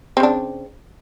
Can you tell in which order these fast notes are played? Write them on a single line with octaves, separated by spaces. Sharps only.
C4 C#3 D4